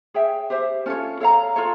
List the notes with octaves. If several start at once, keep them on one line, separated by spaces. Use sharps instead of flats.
G#4 C#5 E5 G5
G4 C5 E5
C#4 F4 A4 C#5
A4 C#5 F5 A#5
F4 A4 C#5